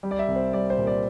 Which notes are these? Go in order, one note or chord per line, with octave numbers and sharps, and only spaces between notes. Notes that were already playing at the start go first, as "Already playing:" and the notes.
G3
D5
E5
C2
C5
G3 D5
C5
A#2
D5